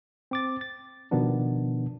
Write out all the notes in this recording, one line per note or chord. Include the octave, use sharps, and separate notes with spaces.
C4 D6 A6
A6
B2 D#3 F3 B3 D4